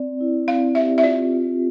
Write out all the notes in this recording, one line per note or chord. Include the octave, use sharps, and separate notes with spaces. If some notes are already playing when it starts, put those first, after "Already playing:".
Already playing: C4 D5
E4
C4 F5
G4 E5
E5
F4 D5
F4